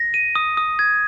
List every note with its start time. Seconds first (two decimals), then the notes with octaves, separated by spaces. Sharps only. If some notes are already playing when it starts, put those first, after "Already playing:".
Already playing: A#6
0.14 D#7
0.35 D#6
0.57 D#6
0.79 G#6